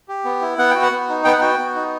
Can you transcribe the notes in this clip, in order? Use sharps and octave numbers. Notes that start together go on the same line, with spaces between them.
G4
B3
E4
B3 F#5
F#4 G5
F#5
B3
D#4
B3 G5
F#5
F#4 G5
B3
D#4